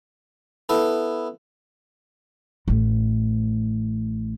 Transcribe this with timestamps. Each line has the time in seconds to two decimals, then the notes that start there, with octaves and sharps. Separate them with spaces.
0.69 B3 E4 A4
2.68 A1 A3